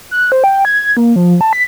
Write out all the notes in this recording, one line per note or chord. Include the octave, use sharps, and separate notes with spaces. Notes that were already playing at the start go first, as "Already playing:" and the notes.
F#6
C5
G5
G#6
A#3
F3
A5
B6